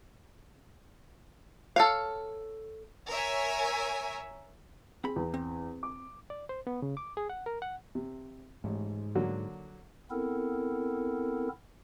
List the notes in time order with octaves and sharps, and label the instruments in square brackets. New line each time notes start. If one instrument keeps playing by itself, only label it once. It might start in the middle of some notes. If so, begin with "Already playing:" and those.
[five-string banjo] A4 C#5 F5
[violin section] A#4 C#5 E5 G#5
[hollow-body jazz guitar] C4 B5 [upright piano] G#4
[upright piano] E2
[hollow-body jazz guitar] C4
[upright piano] D6
[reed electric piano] D5
C5
B3
C#3
D6
G#4
F#5
A#4
F#5
[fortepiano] C3
[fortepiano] A1 [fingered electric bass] G#2
[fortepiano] D3 F#3 A#3
[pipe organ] B3 C4 E4 A4 A#4